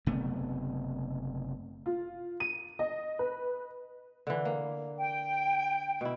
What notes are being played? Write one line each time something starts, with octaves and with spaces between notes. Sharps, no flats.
F#1 C3 A3 B3
F4
D#7
D#5
B4
D3 E3
A#3
G5
B2 E4